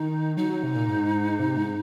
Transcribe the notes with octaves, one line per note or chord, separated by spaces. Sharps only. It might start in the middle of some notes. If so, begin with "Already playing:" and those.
Already playing: D#3 D#4
F#3 D#4
F#3
C3
A#2
G#2
C3
G#2